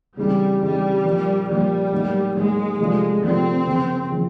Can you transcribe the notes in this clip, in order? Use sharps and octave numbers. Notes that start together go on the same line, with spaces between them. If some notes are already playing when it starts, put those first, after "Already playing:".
C#3 E3 G3 G#3 C4 D#4
C#3 E3 G3 G#3 C4 D#4
A#2 F3 A#3 D4
A#2 F3 G3 A#3 D4
A2 F#3 A#3 D#4
A2 F#3 G#3 A#3 D#4
C3 F3 A3 D4 F4
C3 F3 A3 C4 D4 F4
C#3 F3 A#3
C#3 F3